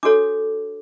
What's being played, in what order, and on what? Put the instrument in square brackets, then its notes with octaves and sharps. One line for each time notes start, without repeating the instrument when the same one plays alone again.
[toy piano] D4 F#4 A4 C#5 D6